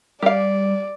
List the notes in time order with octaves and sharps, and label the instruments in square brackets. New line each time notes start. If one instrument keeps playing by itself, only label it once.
[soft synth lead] G3 [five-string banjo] G4 F5 [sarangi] D5